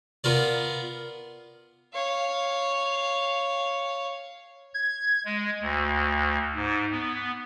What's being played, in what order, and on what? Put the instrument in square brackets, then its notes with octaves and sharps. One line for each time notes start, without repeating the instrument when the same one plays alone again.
[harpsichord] B3 F4 A#4 D5
[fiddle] C#5 F5
[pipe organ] G#6
G#3
D2
G#2
B3